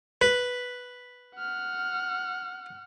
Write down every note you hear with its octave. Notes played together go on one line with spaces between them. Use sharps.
B4
F#5 F6